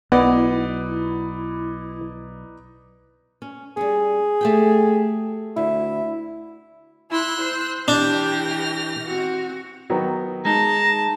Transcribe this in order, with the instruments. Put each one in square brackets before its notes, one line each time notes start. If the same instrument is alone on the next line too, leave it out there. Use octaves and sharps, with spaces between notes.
[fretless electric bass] B1 [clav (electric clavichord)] B3 [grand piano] D#4 B4 D5 [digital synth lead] E4
[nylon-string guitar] C#4
[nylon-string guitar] G3 C#4 [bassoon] G#4
[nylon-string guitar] A3 G4 G5
[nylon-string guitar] D2 [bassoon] E4
[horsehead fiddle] E4 [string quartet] C6 E6 F#6
[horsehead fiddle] C5
[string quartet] E3 F6 A#6 [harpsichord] D4 [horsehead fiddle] G4 G5
[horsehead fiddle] C4 F#4
[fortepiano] D#3 F#3 B3
[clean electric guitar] G#3 D#4 [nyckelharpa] A5 [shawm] A#5